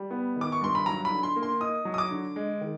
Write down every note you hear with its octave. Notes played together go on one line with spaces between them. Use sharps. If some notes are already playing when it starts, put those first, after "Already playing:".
Already playing: G3
B3
D#3
D6
C#6
G2 C6
B5
F#3 A#5
B5
D3
C6
A#3
C6
D#4 D#6
F#3
D#6
D6
D3
G#3
D#3